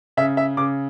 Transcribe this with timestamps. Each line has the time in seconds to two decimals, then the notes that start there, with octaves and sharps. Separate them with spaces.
0.17 C#3 E5
0.37 E5
0.57 C#3 D6